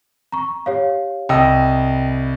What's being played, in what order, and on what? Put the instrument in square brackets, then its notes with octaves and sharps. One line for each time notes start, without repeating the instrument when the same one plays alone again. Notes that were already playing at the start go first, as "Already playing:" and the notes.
[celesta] A#5 C#6
G4 C#5 F5
[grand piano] C2 D#5 E6 [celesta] G5